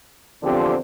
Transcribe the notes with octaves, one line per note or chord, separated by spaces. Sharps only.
E2 D3 F3 C4 G4